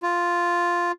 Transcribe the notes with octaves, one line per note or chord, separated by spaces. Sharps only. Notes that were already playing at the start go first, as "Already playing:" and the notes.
F4